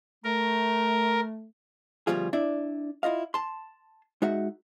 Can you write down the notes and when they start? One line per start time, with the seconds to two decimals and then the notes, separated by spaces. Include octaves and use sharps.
0.24 A3 A#4
2.07 D2 B2 F3 G3 F4 G#4
2.33 D4 E4 D5 E5
3.03 E4 F4 D#5 F5
3.34 A5 C6
4.22 G#3 D#4 F#4 E5 F#5